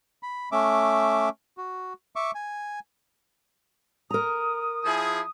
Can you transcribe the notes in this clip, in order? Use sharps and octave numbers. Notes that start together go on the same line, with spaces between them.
B5
A3 C#4 E5 D6
F#4
E5 C#6 D6
G#5
A#4 A#5 D#6
F3 E4 G#4